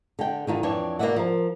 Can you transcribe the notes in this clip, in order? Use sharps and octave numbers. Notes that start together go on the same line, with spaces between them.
D3 G5
D3 D#3 F4
F2 E3 D4 C#5 G5
B2 A#3 A4 D5 E5 F#5
F3 A#4